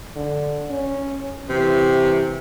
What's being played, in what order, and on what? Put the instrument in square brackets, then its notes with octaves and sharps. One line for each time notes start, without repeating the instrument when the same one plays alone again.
[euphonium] D3
C#4
[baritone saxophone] C3 [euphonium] E3